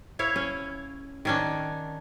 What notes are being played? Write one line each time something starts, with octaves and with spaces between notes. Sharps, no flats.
E4 C#5 F5
C#4
D#3 C#4 D4